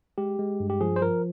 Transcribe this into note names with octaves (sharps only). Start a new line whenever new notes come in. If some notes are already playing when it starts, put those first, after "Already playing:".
G#3 G4
G#3
G2
G4
F3 G#4
C5
F3 A#4